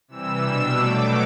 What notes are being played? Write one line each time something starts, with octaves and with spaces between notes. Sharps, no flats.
C3 E3 G3 E6
B2 G3 D4
B2 F#3 A3 D6